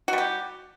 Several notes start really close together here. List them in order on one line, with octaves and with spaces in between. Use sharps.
F#4 G3 G4